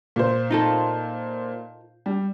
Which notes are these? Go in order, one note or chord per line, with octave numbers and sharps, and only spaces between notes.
A#2 C5
D#4 F4 A4
G3